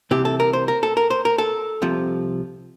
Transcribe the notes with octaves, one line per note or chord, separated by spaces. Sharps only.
C2 C3 E3 G4
A4
A#4
C5
A#4
A4
A#4
C5
A#4
A4
C2 C3 F3